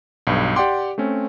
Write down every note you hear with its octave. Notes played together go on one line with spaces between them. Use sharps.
B1 G2
G4 D5 F#5 G5 C6 D6
A3 C4 C#4